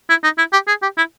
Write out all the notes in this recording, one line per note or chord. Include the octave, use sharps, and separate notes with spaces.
E4
D#4
E4
G4
G#4
G4
E4